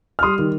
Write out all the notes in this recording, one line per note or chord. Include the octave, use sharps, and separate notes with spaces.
F6
G3 C6 D#6
D#3